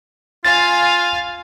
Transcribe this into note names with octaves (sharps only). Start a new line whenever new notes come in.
F4 F5 G#5 A6